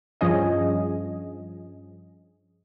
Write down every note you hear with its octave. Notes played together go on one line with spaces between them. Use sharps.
G2 F3 C#4 G#4 D#5